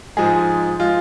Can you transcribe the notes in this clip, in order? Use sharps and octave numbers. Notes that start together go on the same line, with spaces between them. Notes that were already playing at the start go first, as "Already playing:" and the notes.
G#2 F3 G#3 G#4
F3 G#3 F4